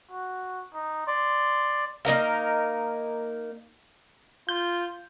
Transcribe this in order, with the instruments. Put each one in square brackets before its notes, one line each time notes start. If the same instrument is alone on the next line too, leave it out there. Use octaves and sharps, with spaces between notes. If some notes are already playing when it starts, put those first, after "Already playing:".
[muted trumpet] F#4
D#4
[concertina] D5 [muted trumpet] C6
[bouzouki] A#3 D#4 A#4 F5
[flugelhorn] F4 [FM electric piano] G6